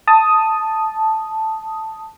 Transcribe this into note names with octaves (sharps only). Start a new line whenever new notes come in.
A5 D#6